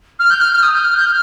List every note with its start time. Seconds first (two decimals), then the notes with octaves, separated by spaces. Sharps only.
0.19 F6
0.30 G6
0.41 F6
0.52 F6
0.63 D#6
0.74 G6
0.84 F6
0.96 G6
1.06 F6